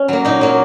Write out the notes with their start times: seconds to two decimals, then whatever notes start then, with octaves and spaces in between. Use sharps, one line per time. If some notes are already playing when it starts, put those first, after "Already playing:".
Already playing: C#4
0.08 F#3 A#3
0.25 A#2 D#4
0.41 F#3 A#3